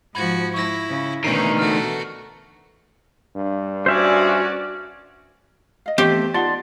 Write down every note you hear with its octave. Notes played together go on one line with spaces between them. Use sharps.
G#2 F3 F#4 B5 G#6
E4 C#6 A#6
C#3
D2 B2 D#3 E3 C#4 D#4 A#5 C7
A3 F#4 F6
G2
C#4 F#4 C5 D5 E5 G#5
D#5 F5
E3 A3 B3 C4 G4
D#4 F4 D5 F#5 A5 C6